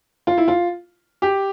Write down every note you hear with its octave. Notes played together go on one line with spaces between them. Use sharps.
F4
E4
F4
G4